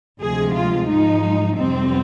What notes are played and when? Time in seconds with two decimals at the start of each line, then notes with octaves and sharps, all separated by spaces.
0.20 D2 C3 F3 G#3 G#4
0.55 F4
0.88 G#2 F3 G#3 D#4
1.55 F2 C3 G3 C4